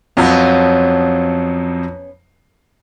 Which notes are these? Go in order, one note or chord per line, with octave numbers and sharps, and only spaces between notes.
F2 F3 F#3 B3 C#4